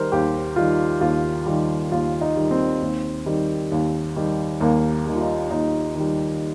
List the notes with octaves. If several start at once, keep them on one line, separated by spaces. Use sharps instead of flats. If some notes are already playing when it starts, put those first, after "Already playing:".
Already playing: D#3 G3 A#4 C5
D#2 G4
D#3 G3 F4
D#2 F4
D#3 G3 F4
D#2 F4
D#4
D#3 G3
C4
D#2
D#3 G3
D#2
D#3 G3
D#2 A#3
D#3 G3
F4
D#4
D#2 D#4
D#3 G3